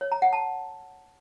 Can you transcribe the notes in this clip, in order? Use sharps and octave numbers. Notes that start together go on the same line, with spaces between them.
C#5
A#5
F#5
A5